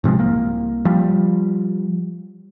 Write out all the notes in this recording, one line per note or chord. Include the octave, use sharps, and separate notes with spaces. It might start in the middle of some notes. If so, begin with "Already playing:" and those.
G#2 C3 F3 G#3
C2 A#3
F3 G3